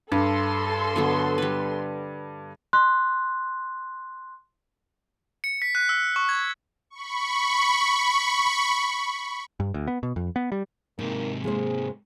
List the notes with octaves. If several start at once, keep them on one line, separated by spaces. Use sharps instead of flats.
G2 A4 D5 C6
D3 F#3 B3
G3 B4
C6 F#6
C#7
B6
F#6
E6
C#6
G#6
B5 C#6
G2
D2
B3
B2
F2
B3
G3
G#2 C3 A#3 D#4
G#3 A#3 G#4 C5